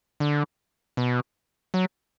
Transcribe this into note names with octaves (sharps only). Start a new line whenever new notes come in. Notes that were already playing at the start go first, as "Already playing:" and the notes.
D3
B2
F#3